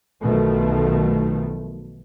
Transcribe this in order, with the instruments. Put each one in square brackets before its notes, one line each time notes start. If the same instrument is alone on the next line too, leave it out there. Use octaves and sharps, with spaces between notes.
[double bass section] B1 B2 D#3 F3 A3